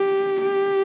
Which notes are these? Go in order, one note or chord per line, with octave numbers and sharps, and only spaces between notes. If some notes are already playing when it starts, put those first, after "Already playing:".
Already playing: G4
G4